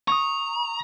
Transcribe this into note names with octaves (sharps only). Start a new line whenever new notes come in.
A#5 C#6 D#6